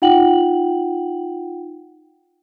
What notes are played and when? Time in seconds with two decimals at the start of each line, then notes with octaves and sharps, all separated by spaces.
0.02 D#4 F4 F#5 G5 F#7